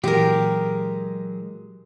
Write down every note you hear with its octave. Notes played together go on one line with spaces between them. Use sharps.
A#2 E3 F#3 G#3 G4 A#4